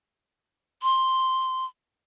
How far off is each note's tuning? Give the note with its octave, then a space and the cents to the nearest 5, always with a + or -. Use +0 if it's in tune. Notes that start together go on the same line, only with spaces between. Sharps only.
C6 +0